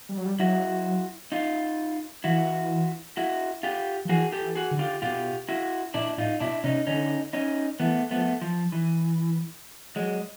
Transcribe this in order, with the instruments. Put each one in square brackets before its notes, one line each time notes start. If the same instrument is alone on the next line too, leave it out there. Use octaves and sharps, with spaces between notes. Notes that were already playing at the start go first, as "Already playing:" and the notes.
[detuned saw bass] G3
F#3
G3
[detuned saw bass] F#3 [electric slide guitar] E4 F#4
[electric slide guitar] D#4 F4
[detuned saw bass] E3 [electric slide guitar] E4 F#4
[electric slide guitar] E4 F#4
F4 G4
[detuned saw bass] F3
[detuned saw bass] E3 [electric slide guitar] F#4 G#4
[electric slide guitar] G4 A4
[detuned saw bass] E3
[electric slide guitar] F#4 G#4
[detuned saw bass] D3
[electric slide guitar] F4 G4
[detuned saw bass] B2 [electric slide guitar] F4 G4
[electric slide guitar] E4 F#4
[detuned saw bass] A#2 [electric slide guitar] D4 E4
[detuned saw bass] A2 [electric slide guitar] D#4 F4
[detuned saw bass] B2 [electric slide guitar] D4 E4
[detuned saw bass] C3 [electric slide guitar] C#4 D#4
[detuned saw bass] D3 [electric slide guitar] C#4 D#4
[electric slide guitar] C#4 D#4
[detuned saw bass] E3 [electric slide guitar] A3 B3
[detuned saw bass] F3 [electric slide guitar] A3 B3
[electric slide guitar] F3
E3
F#3 G#3